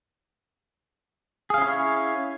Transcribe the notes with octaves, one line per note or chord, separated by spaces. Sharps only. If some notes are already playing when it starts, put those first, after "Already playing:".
C#4 E4 G#4 C#5 F5